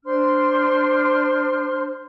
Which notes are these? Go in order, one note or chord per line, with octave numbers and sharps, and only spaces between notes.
D4 C5 C6 F6